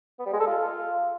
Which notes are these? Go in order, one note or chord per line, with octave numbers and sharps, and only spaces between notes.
B3
G3
G#3
A4
F4